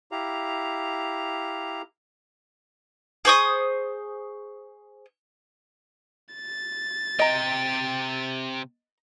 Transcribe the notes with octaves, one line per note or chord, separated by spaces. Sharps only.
E4 G4 F5 A#5
G#4 C5 C#6 D#6
A6
C3 D#5 G5 A#5